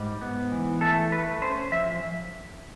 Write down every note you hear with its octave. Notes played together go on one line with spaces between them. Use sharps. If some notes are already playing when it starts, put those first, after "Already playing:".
Already playing: G#2 G3
B3
E3
A3 A4
A3 B4
C#4 C5
F3 E5